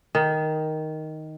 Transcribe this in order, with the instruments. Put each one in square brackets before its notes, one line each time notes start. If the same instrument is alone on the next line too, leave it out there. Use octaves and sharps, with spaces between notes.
[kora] D#3